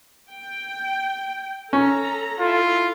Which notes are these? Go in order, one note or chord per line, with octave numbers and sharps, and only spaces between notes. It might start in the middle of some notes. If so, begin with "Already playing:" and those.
G5
C#4 A4 A#5
E4 F4 A4